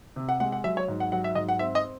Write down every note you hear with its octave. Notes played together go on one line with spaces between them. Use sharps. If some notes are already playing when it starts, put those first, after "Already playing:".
C3
F#5
G#3 F#5
F#5
F#3 E5
C#5
G#2
F#5
F#3 F#5
E5
G#2 D#5
F#5
C4 E5
D#5